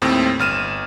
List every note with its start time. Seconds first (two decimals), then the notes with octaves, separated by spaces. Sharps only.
0.02 D#2 A2 C4
0.39 G1 F6 D#7 E7